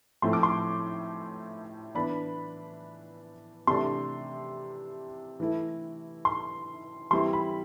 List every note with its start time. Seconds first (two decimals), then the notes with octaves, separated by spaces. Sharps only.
0.22 A2 F3 A3 C4 E4 C6
0.33 D6
0.43 C6
1.95 E3 B3 D4 B5
3.67 C3 E3 A3 D4 C6
5.40 E3 A3 E4
6.25 C6
7.11 E3 G3 C4 E4 C6
7.33 B5